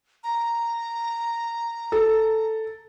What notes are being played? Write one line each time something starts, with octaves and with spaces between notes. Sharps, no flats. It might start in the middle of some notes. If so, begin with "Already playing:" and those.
A#5
A4